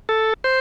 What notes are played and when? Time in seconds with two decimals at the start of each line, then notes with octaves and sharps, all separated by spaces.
0.09 A4
0.44 C5